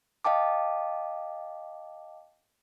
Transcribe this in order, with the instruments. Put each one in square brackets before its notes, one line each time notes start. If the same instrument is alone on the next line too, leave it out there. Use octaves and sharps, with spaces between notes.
[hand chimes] D#5 F5 G5 A5 D6